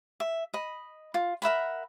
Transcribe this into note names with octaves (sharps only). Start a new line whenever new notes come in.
E5
D#5 B5
F4
A#4 E5 F#5 B5